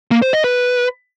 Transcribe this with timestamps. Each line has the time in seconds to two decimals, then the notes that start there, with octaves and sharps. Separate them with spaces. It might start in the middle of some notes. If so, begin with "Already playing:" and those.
0.11 A#3
0.22 C5
0.33 D#5
0.44 B4